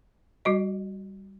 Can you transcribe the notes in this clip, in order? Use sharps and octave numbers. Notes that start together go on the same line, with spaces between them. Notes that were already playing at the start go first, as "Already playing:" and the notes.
G3 F#4 D#5